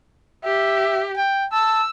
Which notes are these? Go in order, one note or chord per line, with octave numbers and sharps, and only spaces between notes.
G4 E5
G5
A5 E6